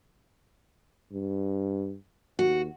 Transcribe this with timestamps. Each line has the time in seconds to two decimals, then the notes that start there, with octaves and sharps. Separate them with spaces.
1.12 G2
2.39 D#2 F#4